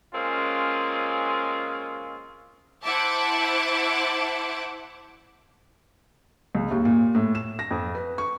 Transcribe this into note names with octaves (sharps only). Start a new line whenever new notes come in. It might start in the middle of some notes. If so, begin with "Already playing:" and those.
G#3 A#3 C4 C#4 F4
E4 C5 E5 F#5 A5 D6
C#2
D#2
A#2
A2
E7
A#6
F2
B4
C#6